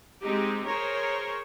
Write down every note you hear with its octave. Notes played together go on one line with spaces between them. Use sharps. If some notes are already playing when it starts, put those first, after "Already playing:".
G#3 C4 D#4 G4
G#4 A#4 C5 C#5